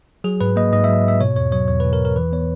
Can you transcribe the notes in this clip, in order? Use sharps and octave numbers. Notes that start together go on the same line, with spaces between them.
F#3 G#4
G#2 B4
A#3 D#5
G#2 D#5
F#3 E5
G#2 E5
B2 C#5
E2 C#5
F#3 C#5
E2 C#5
B2 B4
A#4
E2
A#4
E3 B4
B3 C#5